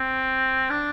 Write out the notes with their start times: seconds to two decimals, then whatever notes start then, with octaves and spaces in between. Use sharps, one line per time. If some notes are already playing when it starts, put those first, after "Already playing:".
Already playing: C4
0.70 D4